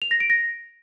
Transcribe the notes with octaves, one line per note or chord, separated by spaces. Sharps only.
F7
A#6
D7
A#6